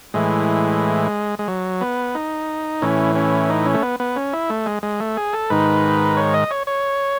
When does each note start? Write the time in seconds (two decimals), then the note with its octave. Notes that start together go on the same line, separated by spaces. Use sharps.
0.14 A2 E3 G#3
1.39 G#3
1.48 F#3
1.81 B3
2.15 D#4
2.82 A2 E3 C#4
3.16 C#4
3.49 D#4
3.65 C#4
3.74 A3
3.82 B3
4.00 B3
4.16 C#4
4.33 E4
4.50 A3
4.66 G#3
4.83 G#3
5.00 A3
5.17 G#4
5.33 A4
5.50 G#2 D#3 B4
6.17 C#5
6.34 D#5
6.51 C#5
6.67 C#5